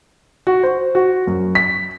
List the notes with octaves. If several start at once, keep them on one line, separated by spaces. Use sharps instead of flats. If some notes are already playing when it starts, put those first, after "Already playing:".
F#4
C5
F#4
F#2
B6